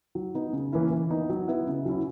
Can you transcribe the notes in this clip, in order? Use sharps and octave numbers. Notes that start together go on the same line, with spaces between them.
F#3
B3 D#4
C#3
E3 A#3 C#4 E4
E3
B3 D#4
F#3
B3 E4
C#3
F#3 C#4 E4